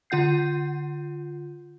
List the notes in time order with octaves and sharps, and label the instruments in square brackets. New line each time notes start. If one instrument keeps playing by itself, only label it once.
[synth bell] D3 F4 F#5 G6 C7